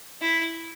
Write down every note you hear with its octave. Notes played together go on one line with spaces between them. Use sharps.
E4